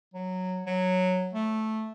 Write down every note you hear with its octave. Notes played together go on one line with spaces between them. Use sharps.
F#3
F#3
A3